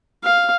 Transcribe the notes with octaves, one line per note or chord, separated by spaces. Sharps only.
F5